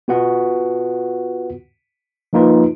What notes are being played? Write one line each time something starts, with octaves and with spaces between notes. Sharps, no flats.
B3 F4 F#4 B4 F#5
F3 A#3 D#4 F4 B4